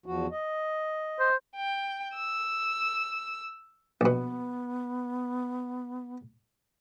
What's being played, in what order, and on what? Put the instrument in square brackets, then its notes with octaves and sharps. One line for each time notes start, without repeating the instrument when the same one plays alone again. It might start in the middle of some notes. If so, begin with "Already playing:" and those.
[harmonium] E2 F3 F#4
D#5
[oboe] C5
[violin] G5
E6
[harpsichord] A#1 B2 [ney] B3